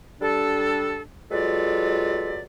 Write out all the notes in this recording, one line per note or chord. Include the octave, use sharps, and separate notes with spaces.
G3 D4 A4
F#3 G#3 F4 A4 B4 D5